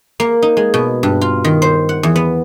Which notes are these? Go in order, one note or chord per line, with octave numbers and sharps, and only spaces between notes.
A#3
D#4
G#3
B2
G2
F4
D#3
C5
F#5
E2
B3